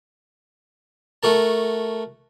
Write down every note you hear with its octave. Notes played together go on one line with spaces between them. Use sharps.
A3 F#4 A#4 A5